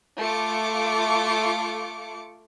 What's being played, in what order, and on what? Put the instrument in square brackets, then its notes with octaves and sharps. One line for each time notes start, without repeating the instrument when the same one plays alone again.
[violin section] A3 F4 D6 C#7